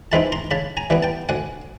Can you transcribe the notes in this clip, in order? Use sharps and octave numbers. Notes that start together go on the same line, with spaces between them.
E3 G#3 C4 D#4 A5 B5
A#5 C6
C#3 A5 B5
G#5 A#5
E3 G3 B3
G5 A5
D2 F#5 G#5